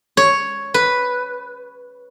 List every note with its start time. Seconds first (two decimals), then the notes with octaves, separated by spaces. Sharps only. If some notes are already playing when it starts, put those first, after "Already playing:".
0.17 C#5
0.74 B4